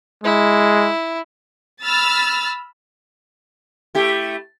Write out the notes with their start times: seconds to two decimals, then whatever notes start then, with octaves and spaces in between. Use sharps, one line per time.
0.24 G#3 E4
1.82 B5 E6 F6 A6
3.95 A3 E4 G4